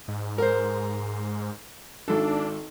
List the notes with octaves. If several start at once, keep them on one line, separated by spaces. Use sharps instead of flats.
G#2
A#4 C5
G#1 D4 A4